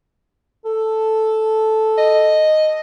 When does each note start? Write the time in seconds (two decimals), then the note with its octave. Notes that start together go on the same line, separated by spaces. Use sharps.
0.65 A4
1.98 D#5